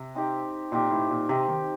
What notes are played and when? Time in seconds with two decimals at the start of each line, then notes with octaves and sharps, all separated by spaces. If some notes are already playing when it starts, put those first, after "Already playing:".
Already playing: C3
0.15 C4 D#4 G4
0.72 A#2 C4 D#4 G4
0.91 A2
1.10 A#2
1.29 C3 C4 D#4 G4
1.48 D#3